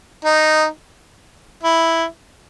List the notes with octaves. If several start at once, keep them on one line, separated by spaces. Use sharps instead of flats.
D#4
E4